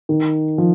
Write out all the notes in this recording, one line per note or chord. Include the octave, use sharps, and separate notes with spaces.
D#3
F3